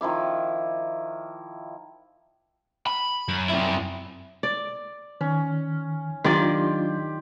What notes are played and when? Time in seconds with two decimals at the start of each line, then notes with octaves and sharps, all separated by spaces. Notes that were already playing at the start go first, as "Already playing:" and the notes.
0.01 D#3 F3 E4 D6
2.87 B5
3.28 F#2
3.49 C4 E4
4.43 D5
5.21 D#3 C#4
6.24 D#3 F#3 D4 F4 G4 D5 C6